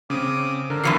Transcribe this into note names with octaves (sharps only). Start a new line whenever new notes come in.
C#3 C4 C#4 D6 D#6
D3 A#4
E2 E3 F#3 C7 C#7